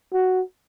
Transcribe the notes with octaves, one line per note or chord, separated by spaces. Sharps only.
F#4